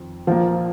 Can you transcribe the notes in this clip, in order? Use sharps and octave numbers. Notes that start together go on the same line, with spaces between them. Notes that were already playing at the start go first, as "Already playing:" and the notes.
Already playing: F2 D#3 C4
A#1 A#2 F3 A#3 F4